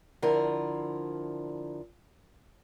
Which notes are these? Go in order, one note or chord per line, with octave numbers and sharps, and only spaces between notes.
D3 F3 E4 A#4